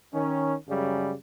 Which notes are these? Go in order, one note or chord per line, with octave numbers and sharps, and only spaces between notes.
D#3 C#4
F#2 C#3 G3 G#3